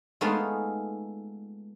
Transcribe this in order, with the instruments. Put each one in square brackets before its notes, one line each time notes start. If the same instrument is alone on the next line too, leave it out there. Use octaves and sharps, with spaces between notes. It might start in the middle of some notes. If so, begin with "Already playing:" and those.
[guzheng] G#3 A3 B3 D#4 F4